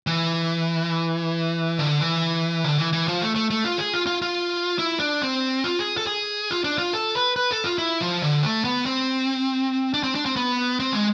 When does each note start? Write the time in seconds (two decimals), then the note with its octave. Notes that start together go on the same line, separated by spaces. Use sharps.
0.07 E3
1.79 D3
2.01 E3
2.64 D3
2.78 E3
2.93 E3
3.08 F3
3.22 A3
3.36 A3
3.50 A3
3.65 F4
3.78 G#4
3.94 F4
4.07 F4
4.22 F4
4.79 E4
5.00 D4
5.22 C4
5.64 F4
5.79 G#4
5.97 A4
6.07 G#4
6.51 F4
6.64 D4
6.78 F4
6.93 A4
7.15 B4
7.36 B4
7.51 A4
7.64 F4
7.78 E4
8.01 F3
8.22 D3
8.43 A3
8.64 B3
8.86 C4
9.94 D4
10.03 C4
10.15 D4
10.26 C4
10.36 B3
10.80 C4
10.93 G#3